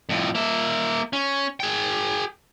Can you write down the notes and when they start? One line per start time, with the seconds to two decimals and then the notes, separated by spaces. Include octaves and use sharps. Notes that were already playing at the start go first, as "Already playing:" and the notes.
0.09 F2 A2
0.35 A#3 E5
1.13 C#4
1.60 G#4 G5